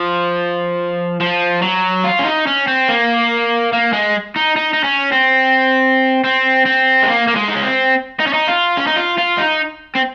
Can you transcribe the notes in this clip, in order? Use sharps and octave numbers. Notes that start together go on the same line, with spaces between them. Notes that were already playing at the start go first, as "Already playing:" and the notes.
Already playing: F3
F3
F#3
F4
C#4
D#4
C#4
C4
A#3
A#3
G#3
D#4
D#4
D#4
C#4
C4
C4
C4
G#3
A#3
A#3
G#3
D#4
C#4
C4
D#4
C#4
D#4
F4
C#4
D#4
F4
F4
D#4
C4